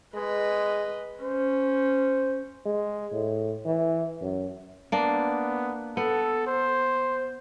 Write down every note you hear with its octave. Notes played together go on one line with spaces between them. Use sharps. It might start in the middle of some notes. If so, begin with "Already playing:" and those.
G#3 B4 D#5
C#4 C5
G#3
A2
E3
F#2
A#3 B3 D4
B3 A4
C5